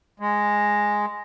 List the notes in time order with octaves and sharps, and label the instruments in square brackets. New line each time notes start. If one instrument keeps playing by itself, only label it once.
[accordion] G#3